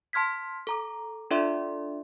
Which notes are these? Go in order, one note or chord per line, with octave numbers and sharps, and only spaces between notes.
A5 C6 F6 G#6 B6
A4 A#5 D6
D4 F4 A4 D5 E5 C6